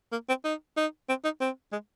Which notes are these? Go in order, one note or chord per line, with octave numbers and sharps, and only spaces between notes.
A#3
C4
D#4
D#4
C4
D#4
C4
G#3